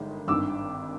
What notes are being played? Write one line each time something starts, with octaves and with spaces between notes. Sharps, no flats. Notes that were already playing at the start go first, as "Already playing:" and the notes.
Already playing: G1 G2 D#3 G#3
G#1 G2 D#3 D6 E6